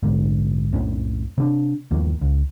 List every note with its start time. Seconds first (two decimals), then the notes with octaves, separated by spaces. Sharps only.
0.03 A#1 F2 G#2 D3
0.72 B1 F2 A2 C#4
1.38 C3 D4
1.91 G1 D#2 F3 A#3
2.21 C#2